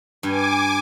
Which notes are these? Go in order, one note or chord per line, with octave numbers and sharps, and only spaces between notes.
G2 G#5 D6